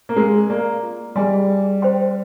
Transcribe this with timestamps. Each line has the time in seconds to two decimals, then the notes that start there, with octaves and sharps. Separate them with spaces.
0.09 A#3
0.16 G#3 A#4
0.50 A#3 D5 F5 A#5
0.83 F4
1.16 G3 G#4 D#5 G#5 C6
1.49 G#4
1.82 C5 G5 C6